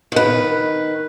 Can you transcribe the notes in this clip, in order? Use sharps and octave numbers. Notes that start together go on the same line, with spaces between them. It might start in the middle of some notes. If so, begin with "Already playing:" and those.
D#3 B4